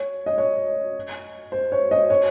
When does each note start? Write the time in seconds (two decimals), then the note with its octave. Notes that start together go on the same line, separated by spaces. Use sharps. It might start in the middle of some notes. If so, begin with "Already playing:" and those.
Already playing: C#5
0.26 D#5
0.38 C#5
1.52 C5
1.72 C#5
1.91 D#5
2.10 C#5